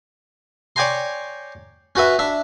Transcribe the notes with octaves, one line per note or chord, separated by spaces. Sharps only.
C#5 D5 G5 G#5 A#5 C6
C#4 F#4 B4 E5
D4 E5